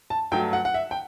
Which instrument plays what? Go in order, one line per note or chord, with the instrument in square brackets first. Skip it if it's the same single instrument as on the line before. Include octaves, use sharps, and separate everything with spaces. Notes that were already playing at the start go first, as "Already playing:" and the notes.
[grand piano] A5
[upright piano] G2 F#3 A3 [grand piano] G5
[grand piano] F#5
F#5
E5
G5